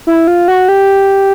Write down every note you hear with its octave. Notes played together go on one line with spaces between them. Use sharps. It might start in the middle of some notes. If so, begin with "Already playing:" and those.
E4
F4
F#4
G4